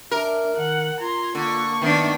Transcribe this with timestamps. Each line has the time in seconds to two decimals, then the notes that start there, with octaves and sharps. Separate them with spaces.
0.11 D4 A#4 E5
0.57 D#3 F#5
1.00 F4 A#5 C6 G#6
1.35 D3 A#3 C#6
1.82 D#3 B3 D4 E5